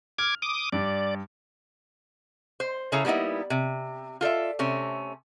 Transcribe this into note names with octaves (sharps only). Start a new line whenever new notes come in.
D6 F6 G#6
D6 D#6
G2 D5
C5
C#3 E4 G#4 A4 C#5 A#5
G3 A#3 B3 D#4 E4
C3
F4 A4 D5 E5
C3 A3 C#4